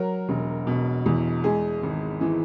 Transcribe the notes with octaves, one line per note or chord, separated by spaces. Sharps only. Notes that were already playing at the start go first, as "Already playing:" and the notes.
Already playing: F#3 A#4
E1
B2
E2
G#3 G#4
G#1
E3